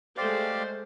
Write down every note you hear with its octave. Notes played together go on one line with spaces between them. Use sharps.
G#3 A3 G4 C5 D5 F5